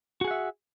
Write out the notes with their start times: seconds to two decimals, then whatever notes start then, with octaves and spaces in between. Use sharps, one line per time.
0.21 F#4
0.24 G#4
0.28 F#5
0.31 E5